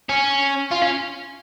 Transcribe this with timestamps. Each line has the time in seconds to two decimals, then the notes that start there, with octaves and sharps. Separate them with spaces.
0.09 C#4
0.71 F4
0.82 C#4